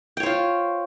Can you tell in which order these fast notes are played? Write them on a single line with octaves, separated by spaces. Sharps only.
G5 C#5 C5 F4